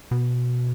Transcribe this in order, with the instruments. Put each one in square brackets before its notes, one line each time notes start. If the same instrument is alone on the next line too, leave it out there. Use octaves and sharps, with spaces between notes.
[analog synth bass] B2